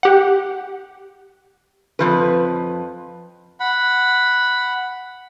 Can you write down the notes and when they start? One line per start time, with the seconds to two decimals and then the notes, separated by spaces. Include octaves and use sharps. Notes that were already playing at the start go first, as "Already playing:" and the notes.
0.03 G4 F#5
1.99 F2 F3 B4
3.60 F#5 B5